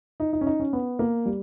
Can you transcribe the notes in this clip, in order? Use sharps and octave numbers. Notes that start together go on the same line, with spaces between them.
D#4
D#4
C#4
D#4
C#4
B3
A#3
G3